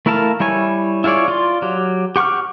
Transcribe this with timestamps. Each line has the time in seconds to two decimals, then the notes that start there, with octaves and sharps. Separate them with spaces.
0.06 A3 E4 A#4 F5 A5
0.40 G3 E4 C#5 G#5
1.04 E4 F4 G#4 C#5 D5
1.28 F4 D5 C6
1.62 F#3 G4
2.16 G4 F#5 C#6 D6 F6